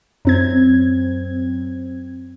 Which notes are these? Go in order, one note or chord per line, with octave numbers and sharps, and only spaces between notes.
F#2 C4 G#6